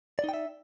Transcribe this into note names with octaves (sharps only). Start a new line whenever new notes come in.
D#4 D5 E5 G5